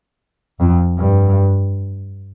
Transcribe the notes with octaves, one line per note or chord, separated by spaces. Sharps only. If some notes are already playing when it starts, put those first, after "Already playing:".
F2
G2